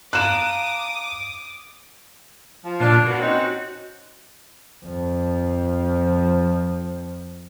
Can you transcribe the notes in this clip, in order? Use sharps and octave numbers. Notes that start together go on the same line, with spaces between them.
F5 A5 A#5 D6 D#6 F#6 E7
F3
A#2 D4 F4
A#3 B3 F#4
C4 C#4 D#4
F2 F3